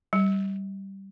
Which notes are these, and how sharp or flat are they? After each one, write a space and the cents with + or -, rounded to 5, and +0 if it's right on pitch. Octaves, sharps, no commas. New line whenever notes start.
G3 -10